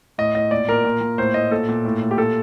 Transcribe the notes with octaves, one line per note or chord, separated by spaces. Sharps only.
A2 D#5
A2 D#5
A#2 D5
A#2 A#4
A#2
A#2
A2 C5
A2 D#5
A#2 A4
A#2
A2
A2
G4
A#2 A4